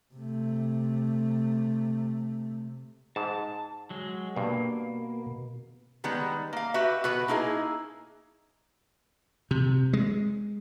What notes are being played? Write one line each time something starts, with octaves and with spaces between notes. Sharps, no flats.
C3 A3
G#2 A5
F#3 G#3
G2 B2 A#3
D#3 G3 G#3 B3
A#3 F5
F#4 G4 B4 E5
B2 F#4 B4
A#3 D#4 E4 G#4
C3
G#3